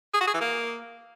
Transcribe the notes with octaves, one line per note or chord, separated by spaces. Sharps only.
G#4
F#4
G#4
E3
A#3